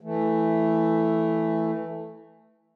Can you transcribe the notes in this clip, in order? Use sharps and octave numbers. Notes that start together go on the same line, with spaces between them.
E3 A3